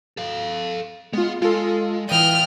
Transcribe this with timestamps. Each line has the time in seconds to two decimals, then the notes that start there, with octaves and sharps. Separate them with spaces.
0.17 A4 F5
1.13 G#3 B3 F4
1.42 G#3 F4 A4
2.09 E3 D5 F5 G5 D#6 F6 D#7